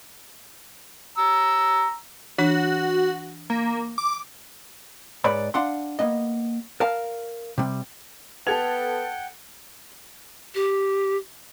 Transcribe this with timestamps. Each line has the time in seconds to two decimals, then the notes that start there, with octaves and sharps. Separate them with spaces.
1.18 A#5 E6
2.38 E3 D4 F#4
3.50 A#3
3.98 D6
5.24 G#2 B4 C#5 D5 B5
5.54 D4 F5 F#5 C6
5.99 A#3 B3 D#5
6.80 A#4 F5 A5
7.58 C3 G3
8.47 B3 A4 F#5 G5 A5 G#6 F7
10.55 G4